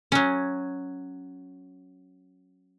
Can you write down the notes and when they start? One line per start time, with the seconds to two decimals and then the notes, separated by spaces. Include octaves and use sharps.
0.12 F#3 C#4